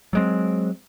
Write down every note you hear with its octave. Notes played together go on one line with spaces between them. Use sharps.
F#3 G#3 C4